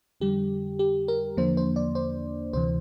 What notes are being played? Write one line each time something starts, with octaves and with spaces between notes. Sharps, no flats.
F2 D3 G3 G4
G4
A#4
E2 D3 F3 A#3 D4 C5
C5
D5
C5
D2 C3 E3 C5